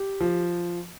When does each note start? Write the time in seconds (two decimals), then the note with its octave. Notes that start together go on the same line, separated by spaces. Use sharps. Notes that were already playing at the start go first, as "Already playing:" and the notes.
Already playing: G4
0.20 F3